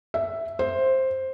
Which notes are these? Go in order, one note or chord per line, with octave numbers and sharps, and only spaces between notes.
E5
C5